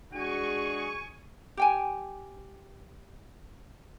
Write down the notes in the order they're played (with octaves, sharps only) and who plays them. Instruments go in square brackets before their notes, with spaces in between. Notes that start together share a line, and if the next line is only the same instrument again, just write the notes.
[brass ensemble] G#3 D4 G#4 [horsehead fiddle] F#4 [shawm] G#5 [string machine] C#6
[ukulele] G4 G5 G#5